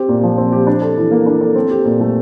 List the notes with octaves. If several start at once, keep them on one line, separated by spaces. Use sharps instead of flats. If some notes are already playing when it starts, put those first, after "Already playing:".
Already playing: C4 G4
A#2
F3
C4
G4
D4
A4
E3
A#3
D4
A4
C4
G4
A#2
A3